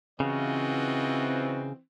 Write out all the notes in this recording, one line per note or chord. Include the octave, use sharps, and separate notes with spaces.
C#3 E3 C4 F4 F#4 D#5